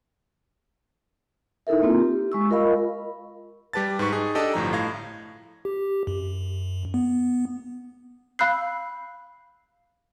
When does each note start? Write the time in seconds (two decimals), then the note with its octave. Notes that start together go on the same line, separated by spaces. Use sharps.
1.67 D#4 E4 A4 A#4 E5
1.82 A#3 C4 F4
2.00 G4
2.32 G#3 C#6 E6
2.50 F4 A#4 D#5 F5 B5
3.73 G3 G4 B4 A5 A6
3.99 G#2 B4 C#6
4.12 D#4 G#4
4.35 D4 G4 A4 D5 D#5
4.54 G1 A2 F3 A#5
4.73 A2 F5 G#6 A#6
5.65 G4
6.07 F#2
6.94 B3
8.39 F5 B5 E6 F#6 G6 C7